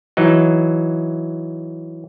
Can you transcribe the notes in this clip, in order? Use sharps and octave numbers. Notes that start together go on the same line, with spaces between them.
E3 F#3 D#4